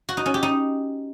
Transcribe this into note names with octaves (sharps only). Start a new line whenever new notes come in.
F#4
D#4
C#4
G4
D#4